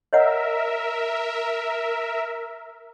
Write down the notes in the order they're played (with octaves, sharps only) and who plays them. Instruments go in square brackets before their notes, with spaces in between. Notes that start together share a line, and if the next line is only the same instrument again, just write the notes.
[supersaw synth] A#4 E5 [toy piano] C#5 D#5 F#5